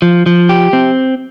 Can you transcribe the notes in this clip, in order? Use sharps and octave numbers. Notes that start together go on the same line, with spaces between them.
F3
F3
G4
C4